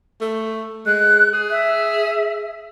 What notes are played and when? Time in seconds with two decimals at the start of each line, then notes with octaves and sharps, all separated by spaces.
0.21 A3
0.86 G#3 F#6
1.33 G#4
1.51 E5